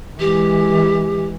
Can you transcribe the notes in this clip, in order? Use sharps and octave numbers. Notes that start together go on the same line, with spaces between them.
E3 G#3 G4